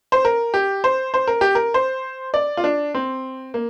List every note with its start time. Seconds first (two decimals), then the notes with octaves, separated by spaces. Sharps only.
0.12 C5
0.25 A#4
0.54 G4
0.84 C5
1.14 C5
1.27 A#4
1.41 G4
1.55 A#4
1.74 C5
2.34 D5
2.57 F4
2.64 D4
2.94 C4
3.54 A#3